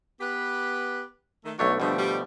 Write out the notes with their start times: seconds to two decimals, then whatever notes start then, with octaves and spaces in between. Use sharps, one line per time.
0.20 B3 G4 B4
1.45 D#3 A3
1.59 B1 F#3 A3 D4 C#5
1.80 B2 D3 F3 G3 A3
1.98 D3 G3